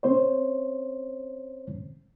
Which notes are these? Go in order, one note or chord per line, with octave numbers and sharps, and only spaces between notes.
C4 C#4 C5 C#5